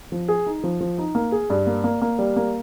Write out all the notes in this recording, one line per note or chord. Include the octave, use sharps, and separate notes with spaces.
F3
G#4
D#4
F3
F3
D#4
A#3
G#4
G2
A#3
A#3
A#3
G3
A#3